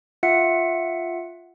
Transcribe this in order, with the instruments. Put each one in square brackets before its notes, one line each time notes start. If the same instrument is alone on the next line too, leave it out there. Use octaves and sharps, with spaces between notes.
[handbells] F4 E5 F#5 C#7